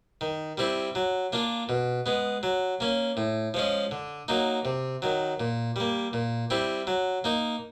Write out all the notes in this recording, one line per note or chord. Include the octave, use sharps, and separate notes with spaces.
D#3
G3 C4 E4
F#3
A#3 D4 F4
B2
G#3 B3
F#3
A#3 C#4
A2
F3 G#3 C#4
D3
F#3 A#3 D#4
C3
D#3 F#3
A#2
G3 A#3
A#2
G3 C4 E4
F#3
A#3 D#4